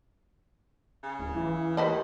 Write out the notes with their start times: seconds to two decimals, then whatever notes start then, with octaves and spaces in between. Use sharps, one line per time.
1.03 C#3
1.19 D1
1.36 E3
1.77 D#2 B4 C5 D#5